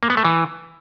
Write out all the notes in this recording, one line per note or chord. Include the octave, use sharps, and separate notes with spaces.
A#3
B3
A3
E3